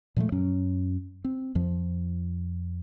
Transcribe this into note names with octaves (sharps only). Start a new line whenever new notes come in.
A#2 F3 G#3 A3
F#2 F#3 C#4
C4
F2 F3